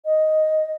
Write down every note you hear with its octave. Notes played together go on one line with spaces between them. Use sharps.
D#5